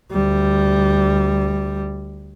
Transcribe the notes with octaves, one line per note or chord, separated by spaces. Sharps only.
D2 G3